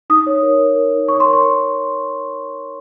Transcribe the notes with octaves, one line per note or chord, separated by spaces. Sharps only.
D#4 D#6
C#5
A#4
A#4
A#4
D#4
C#5 C#6
C6
A#4
C#6